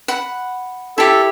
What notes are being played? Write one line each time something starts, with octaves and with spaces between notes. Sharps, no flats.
F#5 B5
E4 G4 A4